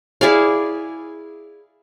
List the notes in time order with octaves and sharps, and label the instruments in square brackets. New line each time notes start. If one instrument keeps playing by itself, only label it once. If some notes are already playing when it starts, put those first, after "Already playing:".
[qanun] E4 G#4 D5 F5